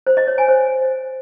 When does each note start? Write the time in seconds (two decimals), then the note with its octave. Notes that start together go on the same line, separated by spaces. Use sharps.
0.07 C5
0.17 D#5
0.27 C#5
0.38 G#5
0.48 C5